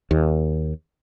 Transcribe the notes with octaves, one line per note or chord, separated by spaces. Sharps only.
D#2